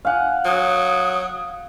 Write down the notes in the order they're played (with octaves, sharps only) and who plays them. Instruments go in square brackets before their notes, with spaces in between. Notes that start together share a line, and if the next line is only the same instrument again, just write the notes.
[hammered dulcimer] F5 F#5 [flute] G#5
[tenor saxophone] F#3 [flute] D#6